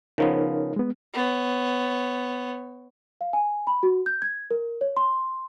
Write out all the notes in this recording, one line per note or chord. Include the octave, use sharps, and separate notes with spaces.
C#3 F3 B3 D#4 A#4 C#5
G#3 B3
B3 C#5
F5
G#5
B5
F#4
G6
G#6
A#4
C#5
C6